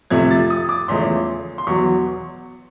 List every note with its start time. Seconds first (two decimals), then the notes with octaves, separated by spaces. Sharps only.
0.10 F2 C3 F3 A3 G#6
0.30 A6
0.50 D#6
0.69 D6
0.88 E2 C#3 F3 A3 C#4 C6
1.58 C6
1.67 E2 B2 F#3 C#6